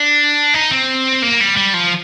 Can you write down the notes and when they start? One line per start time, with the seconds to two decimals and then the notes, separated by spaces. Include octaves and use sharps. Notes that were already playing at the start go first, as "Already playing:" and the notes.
Already playing: D4
0.54 D#4
0.71 C4
1.22 A#3
1.41 G3
1.57 G3
1.74 F3